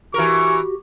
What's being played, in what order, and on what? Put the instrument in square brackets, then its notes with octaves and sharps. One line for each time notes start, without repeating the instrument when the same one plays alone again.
[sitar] E3 A#4 [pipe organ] F#4 G4 [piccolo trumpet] C#6